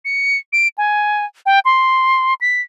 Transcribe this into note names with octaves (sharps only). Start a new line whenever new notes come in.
C#7
D7
G#5
G5
C6
B6